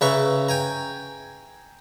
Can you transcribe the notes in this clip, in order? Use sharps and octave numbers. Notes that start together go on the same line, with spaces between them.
C#3 B4 E5 A#5 C#6
G5 G#5 A#5